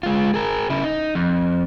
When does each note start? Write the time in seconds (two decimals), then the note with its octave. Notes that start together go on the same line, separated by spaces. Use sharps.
0.03 G#3 F4
0.34 G#4 A#4
0.70 C#3 E4
0.84 D#4
1.15 F2